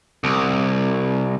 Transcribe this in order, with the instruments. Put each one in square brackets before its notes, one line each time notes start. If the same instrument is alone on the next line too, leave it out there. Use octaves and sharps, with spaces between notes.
[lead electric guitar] C2